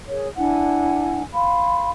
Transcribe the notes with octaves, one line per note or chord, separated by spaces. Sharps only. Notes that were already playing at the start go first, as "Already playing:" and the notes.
G#4 A#4 C#5
D4 E4 F#5 G#5
F5 B5 C6